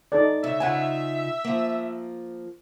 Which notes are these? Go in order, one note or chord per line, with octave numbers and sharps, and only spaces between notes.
D#4 A4 D5
C#3 E5
C#3 D#4 F4 F#5 G#5
F3 A#3